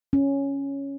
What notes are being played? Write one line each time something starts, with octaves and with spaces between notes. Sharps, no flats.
C#4